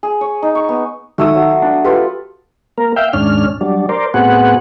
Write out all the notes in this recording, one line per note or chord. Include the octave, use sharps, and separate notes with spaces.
G#4
C#5
D#4
C#6
B3
D#3 A3 F#4 D#6 E6
F#3
D4
F4 G4 A4 B4
A#3 A#4
E5 F5 G5
D#2 G#2 C#4 D4 F6
F#3 G3 D4
A#4 C5 D5
A2 B3 C4 F#4 G#4 F#5